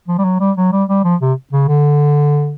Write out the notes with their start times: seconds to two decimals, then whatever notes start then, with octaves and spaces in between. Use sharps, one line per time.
0.08 F3
0.18 G3
0.24 F#3
0.40 G3
0.57 F#3
0.72 G3
0.89 G3
1.04 F3
1.21 C3
1.53 C#3
1.68 D3